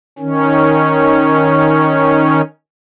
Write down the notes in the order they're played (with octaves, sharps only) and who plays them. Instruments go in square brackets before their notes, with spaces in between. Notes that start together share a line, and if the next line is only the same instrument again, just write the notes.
[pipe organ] D#3 C#4